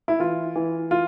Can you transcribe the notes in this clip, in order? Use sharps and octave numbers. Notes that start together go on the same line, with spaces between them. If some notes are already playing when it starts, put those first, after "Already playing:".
E4
E3 F4
E3
F4